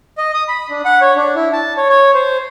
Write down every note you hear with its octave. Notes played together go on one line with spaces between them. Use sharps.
D#5
D#6
B5
D4
F#5
C#5
D4
E4
A5
C#5
C#5
C5